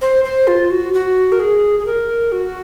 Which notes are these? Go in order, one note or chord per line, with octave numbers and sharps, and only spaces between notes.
C5
C5
F4
F#4
F#4
A#4
G#4
G#4
A#4
F#4